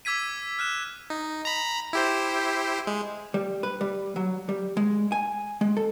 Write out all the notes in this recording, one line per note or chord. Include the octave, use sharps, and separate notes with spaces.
D6 E6 G#6 B6 D#7
F6 F#6 E7
D#4
A#5 B5
E4 G4 C5
G#3
G3
B4
G3
F#3
G3
G#3
G#5
G#3
A4